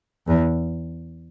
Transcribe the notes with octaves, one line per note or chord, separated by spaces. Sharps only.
E2